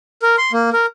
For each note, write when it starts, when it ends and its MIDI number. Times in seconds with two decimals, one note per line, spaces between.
0.22 0.36 70
0.38 0.52 84
0.53 0.70 58
0.73 0.86 70